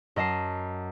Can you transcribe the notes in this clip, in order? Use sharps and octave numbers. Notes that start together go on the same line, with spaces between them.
F#2 D#5 A5 C7